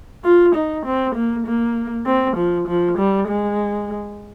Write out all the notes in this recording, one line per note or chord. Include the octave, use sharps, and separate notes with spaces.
F4
D#4
C4
A#3
A#3
C4
F3
F3
G3
G#3